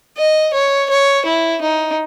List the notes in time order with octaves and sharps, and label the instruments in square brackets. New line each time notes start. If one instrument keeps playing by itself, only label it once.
[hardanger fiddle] D#5
C#5
C#5
E4
D#4